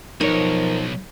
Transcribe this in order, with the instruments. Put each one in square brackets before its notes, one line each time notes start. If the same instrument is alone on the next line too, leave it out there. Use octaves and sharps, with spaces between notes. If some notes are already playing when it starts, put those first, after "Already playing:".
[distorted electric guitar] B1 [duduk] F3 [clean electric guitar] D#4 C#5 [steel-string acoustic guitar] A#4